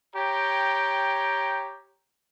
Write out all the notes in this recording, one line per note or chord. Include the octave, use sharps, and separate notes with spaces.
G4 C#5 G5 A#5